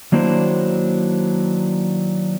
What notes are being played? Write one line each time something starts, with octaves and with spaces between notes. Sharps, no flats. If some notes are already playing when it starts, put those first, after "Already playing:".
D#3 F#3 A#3 D4 E4 C5